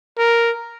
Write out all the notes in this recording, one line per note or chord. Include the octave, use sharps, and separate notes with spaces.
A#4